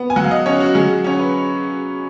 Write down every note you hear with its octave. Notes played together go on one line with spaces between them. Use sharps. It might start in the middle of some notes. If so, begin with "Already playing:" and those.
Already playing: B3
G#5
F#3 F#5
F5
D#5
C#4 C#5
F#4
F#3 G#4
C#4 C#5
B4